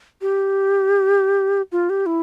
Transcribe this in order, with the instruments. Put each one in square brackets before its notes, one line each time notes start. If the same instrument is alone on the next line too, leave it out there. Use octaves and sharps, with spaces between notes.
[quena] G4
F4
G4
E4